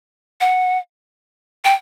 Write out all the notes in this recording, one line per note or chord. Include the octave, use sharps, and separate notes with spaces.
F#5
G5